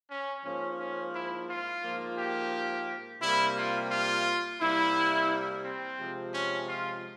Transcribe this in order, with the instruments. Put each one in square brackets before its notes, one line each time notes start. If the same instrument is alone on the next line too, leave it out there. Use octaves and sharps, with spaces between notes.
[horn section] C#4
G#2 F3 A#3 C#4
C#4
E4
F4
G#2 F3 A#3
G4
C3 G3 A#3 E4
F4
F4
C3 G3 A#3 E4
C4
C3 F3 G#3
C#4
F4